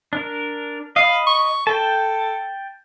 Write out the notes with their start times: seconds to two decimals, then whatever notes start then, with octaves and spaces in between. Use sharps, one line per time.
0.13 D4 A#4
0.96 D#5 F5 B5
1.27 C#6
1.67 A4 G5 A5